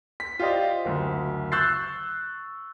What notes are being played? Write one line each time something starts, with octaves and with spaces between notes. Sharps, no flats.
B6
F4 G4 C5 D5 D#5
F#1 D2
C#6 E6 F#6 G6 A6 C7